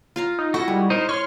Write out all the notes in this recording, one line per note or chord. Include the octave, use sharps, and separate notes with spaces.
F4 F5 A#5
D#4
E4 F#4 A4 A#6
G3 G#3
D#4 A#4 C5
C#5 C6 F6